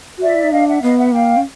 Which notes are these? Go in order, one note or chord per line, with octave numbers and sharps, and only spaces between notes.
F#4
F4 D5 E5
E4
D#4
D4 D#5 F5
E5 F#5
B3 D#5 F5
E5 F#5
A#3 F5 G5
C#4